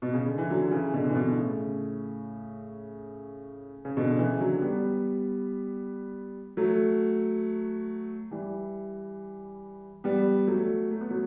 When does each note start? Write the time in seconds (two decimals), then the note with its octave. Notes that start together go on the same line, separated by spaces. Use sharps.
0.02 B2
0.14 C#3
0.26 D3
0.38 E3
0.50 D3 F#3
0.71 C#3 E3
0.93 B2 D3
1.09 E3
1.15 B2 D3
1.36 A2 C#3
3.85 C#3
3.97 B2 D3
4.19 C#3 E3
4.41 D3 F#3
4.62 G3 B3
6.57 F#3 A3
8.31 E3 G3
10.04 G3 B3
10.48 F#3 A3
10.91 A3
11.01 B3
11.10 F#3 A3